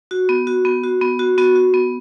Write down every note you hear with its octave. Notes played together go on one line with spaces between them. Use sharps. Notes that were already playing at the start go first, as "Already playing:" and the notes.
F#4
B3
F#4
B3
F#4
B3
F#4
B3 F#4
F#4
B3